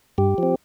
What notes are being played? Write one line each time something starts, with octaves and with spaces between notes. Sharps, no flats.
G2 G4
F3 C4